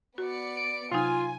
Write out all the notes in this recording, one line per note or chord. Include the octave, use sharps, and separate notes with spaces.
B3 F#4 D5 C#7
D7
C3 F#3 D#4 F4 G#5